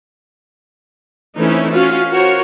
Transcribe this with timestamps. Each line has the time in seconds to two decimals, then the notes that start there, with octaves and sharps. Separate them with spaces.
1.37 E3 A3 C4 C#4 D#4 E4
1.72 C#4 F4 F#4 F5
2.10 F4 F#4 A#4 C5 C#5